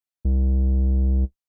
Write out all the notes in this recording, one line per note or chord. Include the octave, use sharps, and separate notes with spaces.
C2